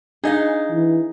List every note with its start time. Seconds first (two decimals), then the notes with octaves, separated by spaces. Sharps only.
0.24 D4 D#4 G#4 D#5 F5
0.70 E3